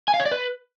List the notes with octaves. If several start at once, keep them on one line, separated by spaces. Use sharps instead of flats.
G#5
F5
C#5
D5
B4